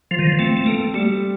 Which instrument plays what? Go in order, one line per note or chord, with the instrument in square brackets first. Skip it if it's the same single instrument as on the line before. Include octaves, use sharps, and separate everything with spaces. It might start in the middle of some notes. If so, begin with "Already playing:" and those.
[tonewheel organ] F3 [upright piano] F4
[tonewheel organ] D#3
F3
[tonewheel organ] A3 [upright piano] C4
[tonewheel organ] A3
[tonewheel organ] A#3 [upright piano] A4
[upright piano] G3 [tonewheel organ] A3